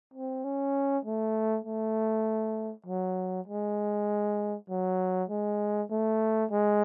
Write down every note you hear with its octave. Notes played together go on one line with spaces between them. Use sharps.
C4
C#4
A3
A3
F#3
G#3
F#3
G#3
A3
G#3